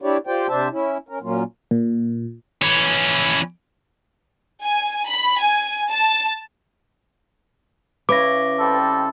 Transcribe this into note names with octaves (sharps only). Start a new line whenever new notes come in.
D4 E4 G4 C#5 D5
F4 G4 C5 D5 G5
C3 D4 C5 E5 A5
C#4 E4
C#4 A#4
A#2 F#3 A#3 C#4 F4
A#2
E3 C#4
G#5
B5
G#5
A5
C#3 E4 B4 C#5 D6 A#6
G3 C4 A4